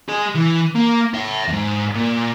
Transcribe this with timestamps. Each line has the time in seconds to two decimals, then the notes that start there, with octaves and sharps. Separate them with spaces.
0.09 G#4 D#5
0.35 E3
0.75 A#3
1.14 C#5 E5
1.48 E2 G#2
1.94 A#2